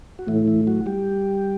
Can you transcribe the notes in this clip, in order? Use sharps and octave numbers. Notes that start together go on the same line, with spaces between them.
F#4
A2 E3 E4
E3 E4
F#3 F#4
G3 G4